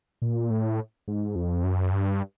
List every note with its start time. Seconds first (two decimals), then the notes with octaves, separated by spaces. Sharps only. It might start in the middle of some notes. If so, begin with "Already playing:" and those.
0.22 A#2
0.50 A2
1.08 G#2
1.36 F2
1.64 F#2
1.92 G2